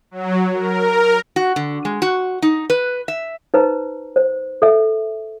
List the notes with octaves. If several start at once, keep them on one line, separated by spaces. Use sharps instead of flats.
F#3
A#4
F#4
D3
G#3
F#4
D#4
B4
E5
D#4 B4 C5 A#5
C5
A4 E5